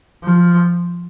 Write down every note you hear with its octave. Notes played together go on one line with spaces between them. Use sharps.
F3